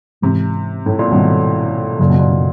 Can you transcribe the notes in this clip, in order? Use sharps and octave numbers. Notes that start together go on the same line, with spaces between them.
G#2 C3 E3 G#3
A2
A#2
G#2 B2 D#3 G3 C4
F#2 A#2 C#3 F#3
B2
A#2
B2